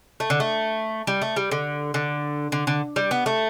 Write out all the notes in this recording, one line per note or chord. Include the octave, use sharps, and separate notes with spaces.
A3
D3
A3
G3
A3
G3
D3
D3
D3
D3
G3
B3
A3